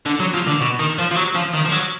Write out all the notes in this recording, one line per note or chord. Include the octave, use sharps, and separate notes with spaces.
D3
F#3
F3
D3
B2
D#3
F3
F3
F#3
F3
D#3
F3
F#3